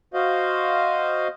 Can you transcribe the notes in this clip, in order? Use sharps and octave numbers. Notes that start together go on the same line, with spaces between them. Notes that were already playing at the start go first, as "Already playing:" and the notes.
F#4 C5 D#5 F5